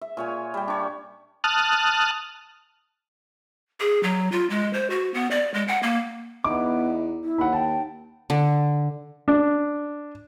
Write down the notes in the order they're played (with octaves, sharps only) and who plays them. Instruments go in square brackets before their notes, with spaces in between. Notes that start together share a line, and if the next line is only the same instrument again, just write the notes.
[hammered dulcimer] E5
A#2 C#5 G#5
G3 G5
D4 C#5
[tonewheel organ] A5 D#6 F6 F#6
[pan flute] G#4
F#3
F4
G#3
C5
F#4
B3
D5
G#3
F#5
A#3
[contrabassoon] E2 [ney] B3 [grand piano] D#4 E4 D6
[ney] E4
[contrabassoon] D#2 [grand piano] F#5 B5
[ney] G5 [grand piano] A5
[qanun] D3
[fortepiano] D4